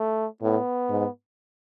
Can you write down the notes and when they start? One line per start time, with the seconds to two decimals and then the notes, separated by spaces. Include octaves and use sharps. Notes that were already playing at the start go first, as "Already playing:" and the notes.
Already playing: A3
0.42 A2 B3
0.90 G#2